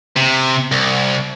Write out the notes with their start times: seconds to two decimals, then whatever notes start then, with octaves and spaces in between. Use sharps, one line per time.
0.16 C3
0.71 C2